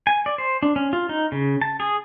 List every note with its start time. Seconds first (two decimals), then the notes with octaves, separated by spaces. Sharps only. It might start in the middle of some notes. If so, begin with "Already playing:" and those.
0.07 G#5
0.26 D5
0.38 C5
0.63 D4
0.76 C#4
0.93 F4
1.09 D#4
1.32 C#3
1.62 A5
1.80 G#4